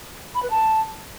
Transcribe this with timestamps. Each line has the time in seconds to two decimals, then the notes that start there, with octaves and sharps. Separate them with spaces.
0.34 B5
0.42 B4
0.50 A5